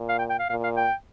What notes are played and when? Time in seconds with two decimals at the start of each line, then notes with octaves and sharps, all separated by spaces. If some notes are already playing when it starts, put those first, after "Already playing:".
Already playing: A#2
0.09 F5
0.19 G5
0.30 G5
0.39 F5
0.49 A#2 F5
0.64 F5
0.77 G5